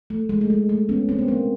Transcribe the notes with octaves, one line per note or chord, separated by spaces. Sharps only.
A3
G#3
A3
G#3
A3
B3 C#4
A#3 C4
B3
G#3 A#3